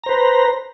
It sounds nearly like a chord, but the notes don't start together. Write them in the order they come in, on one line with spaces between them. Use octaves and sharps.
A#5 C5 B4